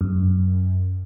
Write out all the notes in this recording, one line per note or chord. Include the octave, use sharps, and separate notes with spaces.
F#2